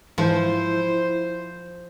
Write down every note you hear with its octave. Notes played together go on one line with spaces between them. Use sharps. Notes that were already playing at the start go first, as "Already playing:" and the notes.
G#2 E3 F3 E4 C5